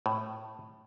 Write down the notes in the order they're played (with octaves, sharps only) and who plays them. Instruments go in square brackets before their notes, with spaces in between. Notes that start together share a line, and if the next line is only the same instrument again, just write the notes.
[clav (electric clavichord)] A2